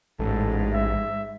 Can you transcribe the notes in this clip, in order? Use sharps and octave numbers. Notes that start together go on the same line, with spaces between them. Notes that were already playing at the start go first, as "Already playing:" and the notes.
A1 G#2 A4
E5